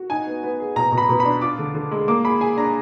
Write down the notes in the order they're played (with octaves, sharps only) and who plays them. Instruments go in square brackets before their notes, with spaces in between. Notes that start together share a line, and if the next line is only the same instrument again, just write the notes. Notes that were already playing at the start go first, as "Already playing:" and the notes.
Already playing: [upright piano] F#4
[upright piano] D#4 [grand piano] G#5
[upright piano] B3
B3
G#4
[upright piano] B2 [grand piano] A#5
[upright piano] B2
[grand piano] B5
[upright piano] B2
[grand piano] B5
[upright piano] D4
[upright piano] F4 [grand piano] D6
[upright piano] D3
D3
G#3
[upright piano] A#3 [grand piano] D6
[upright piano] G#4 [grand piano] B5
[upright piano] G#4 [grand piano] G#5
[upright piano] D4 [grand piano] A#5